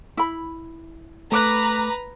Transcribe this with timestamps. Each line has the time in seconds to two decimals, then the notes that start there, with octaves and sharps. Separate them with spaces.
0.17 E4 B5
1.32 A3 B4 A#5 D6 F#6